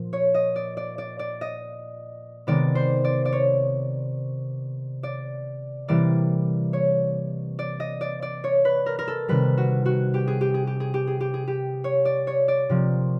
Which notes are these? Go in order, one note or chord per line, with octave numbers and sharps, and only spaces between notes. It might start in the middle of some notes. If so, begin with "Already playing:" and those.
Already playing: A#2 F3
C#5
D#5
D5
D5
D5
D5
D#5
C3 D#3 G#3 B3 D5
C5
D5
D5
C#5
D5
C3 E3 G3 A#3 D5
C#5
D5
D#5
D5
D5
C#5
B4
A#4
A#4
A4
C3 D#3 G3 B4
F#4
F#4
G4
G#4
G4
G#4
G4
G#4
G4
G#4
G4
G#4
G4
C#5
D5
C#5
D5
C3 F3 A#3